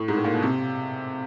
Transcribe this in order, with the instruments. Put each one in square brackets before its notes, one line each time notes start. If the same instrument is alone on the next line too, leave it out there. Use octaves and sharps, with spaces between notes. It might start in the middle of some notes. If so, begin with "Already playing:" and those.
Already playing: [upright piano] A2
G#2
A2
A#2
B2
C3